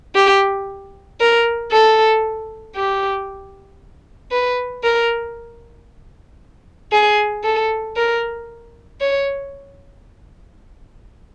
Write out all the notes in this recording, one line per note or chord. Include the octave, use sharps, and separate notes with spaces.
G4
A#4
A4
G4
B4
A#4
G#4
A4
A#4
C#5